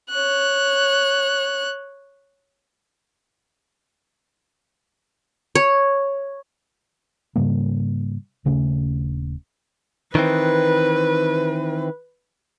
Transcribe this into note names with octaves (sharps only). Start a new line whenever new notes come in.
C#5 F#6
C#5
G#2 C#3 G3 A#3
D#1 C#3 A3 C#4
D#3 E3 C4 B4